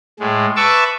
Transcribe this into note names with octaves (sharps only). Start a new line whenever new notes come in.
A2 G#3
B4 E5 A5 C#6 D6 E6